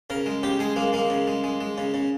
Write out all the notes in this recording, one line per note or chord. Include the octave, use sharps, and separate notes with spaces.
C#3 A#4
G#3
C#3 G4
G#3 G#4
G#3 A#3
G#3 A#3
C#3
G#3
G#3
G#3
C#3
C#3